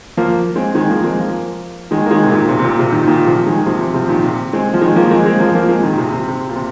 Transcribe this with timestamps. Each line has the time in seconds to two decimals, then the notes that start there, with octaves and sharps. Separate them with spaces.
0.17 F3 A#3
0.56 G#3 C4
0.75 D#3 G#3
0.90 F3 A#3
1.04 G#3 C4
1.19 F3 A#3
1.91 D#3 G#3
2.06 A#3
2.11 D#3 G#3
2.23 C3
2.30 A#2 D#3
2.49 C3
2.59 C3
2.64 A#2
2.79 C3
2.92 A#2 D#3
3.07 A#2 D#3
3.26 C3 F3
3.46 D#3 G#3
3.66 C3 F3
3.81 C3
3.94 C3 F3
4.09 A#2 D#3
4.24 C3
4.53 G#3 C4
4.74 F3
4.81 D#3 G#3
4.96 F3 A#3
5.11 G#3 C4
5.26 G#3 C4
5.39 F3 A#3
5.55 F3 A#3
5.69 G#3 C4
5.83 A#2 D#3
5.98 C3
6.13 C3
6.28 C3
6.49 A#2
6.56 C3